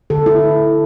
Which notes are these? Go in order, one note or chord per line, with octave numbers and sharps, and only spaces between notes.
D3 A4
E4